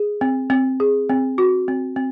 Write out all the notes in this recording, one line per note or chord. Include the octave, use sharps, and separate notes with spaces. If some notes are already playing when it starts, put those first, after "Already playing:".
Already playing: G#4
C4
C4
G#4
C4
F#4
C4
C4